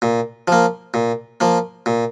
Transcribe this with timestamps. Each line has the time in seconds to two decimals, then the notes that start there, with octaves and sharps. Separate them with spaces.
0.02 A#2
0.48 F3 A#3
0.94 A#2
1.40 F3 A#3
1.86 A#2